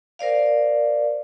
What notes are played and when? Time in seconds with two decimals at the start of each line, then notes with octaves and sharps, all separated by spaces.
0.19 A#4 C5 D5 F5